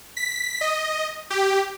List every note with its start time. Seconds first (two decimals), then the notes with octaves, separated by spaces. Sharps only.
0.17 B6
0.61 D#5
1.30 G4